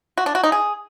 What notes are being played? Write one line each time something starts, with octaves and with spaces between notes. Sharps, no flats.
F#4
D4
F#4
D#4
G#4